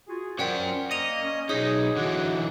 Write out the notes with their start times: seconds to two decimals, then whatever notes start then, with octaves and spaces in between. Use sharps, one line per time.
0.08 F4 F#4 G#4
0.39 C#4 A#4 C5 D5 F#5 G5 B6
0.91 A#3 D#5 C#7 D#7 F7
1.23 C#4
1.49 B1 D#4 G#4 C#5 D#5 B6
1.97 D3 E3 F#4 F#5